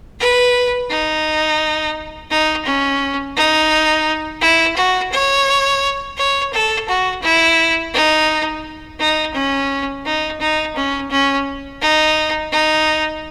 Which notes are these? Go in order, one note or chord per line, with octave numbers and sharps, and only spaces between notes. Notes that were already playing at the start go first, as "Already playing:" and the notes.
B4
D#4
D#4
C#4
D#4
E4
F#4
C#5
C#5
A4
F#4
E4
D#4
D#4
C#4
D#4
D#4
C#4
C#4
D#4
D#4